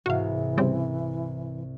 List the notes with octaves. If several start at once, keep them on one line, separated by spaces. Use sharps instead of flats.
C2 G#2 E3 F#4 F5
C#3 G3 C4